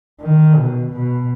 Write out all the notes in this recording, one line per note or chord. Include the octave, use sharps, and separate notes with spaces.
D#3
B2
B2